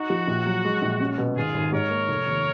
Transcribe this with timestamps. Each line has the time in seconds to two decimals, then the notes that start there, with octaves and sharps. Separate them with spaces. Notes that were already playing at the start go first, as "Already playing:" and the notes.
Already playing: D#4 F#4
0.10 F3
0.27 A#1
0.46 F#3
0.65 G#3
0.82 A#1
1.00 C#4
1.18 B2
1.36 G#1 F4 G#4
1.54 G#1
1.72 G#2 A#4 C#5
1.90 A#3
2.09 F1
2.27 D#2